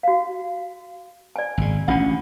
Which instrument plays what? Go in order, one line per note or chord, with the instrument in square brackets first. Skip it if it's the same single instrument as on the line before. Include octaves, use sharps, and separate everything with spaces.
[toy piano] F#4 F5
D5 G#5
[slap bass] G#1 C#3
[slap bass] A1 C#4 [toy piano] D4 F4 F#5